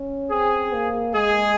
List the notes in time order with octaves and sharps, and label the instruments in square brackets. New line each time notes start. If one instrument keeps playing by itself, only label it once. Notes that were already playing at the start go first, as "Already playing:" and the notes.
Already playing: [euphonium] C#4
[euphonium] C4 [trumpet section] G#4
[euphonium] A#3
[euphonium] G#3 [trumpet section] G#4